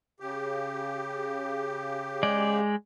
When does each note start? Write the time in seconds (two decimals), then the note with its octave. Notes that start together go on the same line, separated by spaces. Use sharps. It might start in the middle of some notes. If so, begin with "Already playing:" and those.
0.20 C#3 G4
2.23 G#3 D5